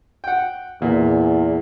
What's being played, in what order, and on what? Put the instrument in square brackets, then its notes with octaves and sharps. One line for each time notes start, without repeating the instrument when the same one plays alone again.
[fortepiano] F#5 G5
[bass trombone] E2 [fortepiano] A#2